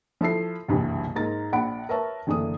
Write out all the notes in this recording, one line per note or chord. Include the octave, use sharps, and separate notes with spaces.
F3 E4 A4 C7
F#1 C2 G2 B2 E3
G#2 A#3 A#5 A6
A#1 D4 F#5 B5 D7
A#4 B4 C#5 E5 A5
F#1 D3 E3 A3 D4 D#6